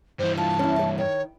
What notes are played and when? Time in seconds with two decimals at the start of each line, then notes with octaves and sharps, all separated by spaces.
0.19 G2 E3 C5
0.37 F4 A5
0.59 C#4 E4
0.79 C#5
0.98 D#3 C#5